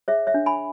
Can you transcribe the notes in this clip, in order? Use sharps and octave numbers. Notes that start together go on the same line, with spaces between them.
G#4 C#5 E5
C#5 E5
D4
G#5 B5